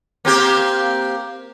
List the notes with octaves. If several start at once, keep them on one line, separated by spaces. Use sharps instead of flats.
A#3 C4 G4